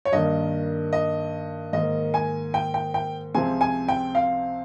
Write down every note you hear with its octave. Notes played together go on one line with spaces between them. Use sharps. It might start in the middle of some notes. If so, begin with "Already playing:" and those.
C#5
G2 D#3 A#3 D#5
D#5
G#2 D#3 A#3 D#5
G#5
G5
G5
G5
C#2 C3 F3 G#3 C4 G#5
G#5
G5
F5